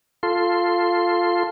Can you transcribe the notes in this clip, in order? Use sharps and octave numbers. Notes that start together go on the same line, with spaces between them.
F4 A4 C6